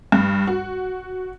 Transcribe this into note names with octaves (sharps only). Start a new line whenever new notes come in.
G2
F#4